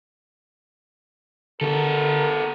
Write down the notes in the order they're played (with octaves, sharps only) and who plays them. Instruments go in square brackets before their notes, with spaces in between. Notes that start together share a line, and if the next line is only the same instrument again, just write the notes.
[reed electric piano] D3 [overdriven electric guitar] B3 A4 [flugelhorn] A#4